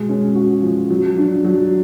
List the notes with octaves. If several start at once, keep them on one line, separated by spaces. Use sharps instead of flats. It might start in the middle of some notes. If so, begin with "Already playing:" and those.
Already playing: B2 G#3
C#4
F#4
F3
F#3
D4
F#3